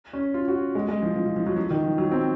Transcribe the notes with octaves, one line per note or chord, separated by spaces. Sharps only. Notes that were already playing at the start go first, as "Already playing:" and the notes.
C#4
F4
F#4
G#3
G#3
F3
F3
F3
F3
F#3
F3
D#3
F3
F#3
C4